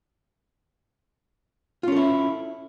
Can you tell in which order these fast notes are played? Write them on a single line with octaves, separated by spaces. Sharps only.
F4 C#4 A4 E4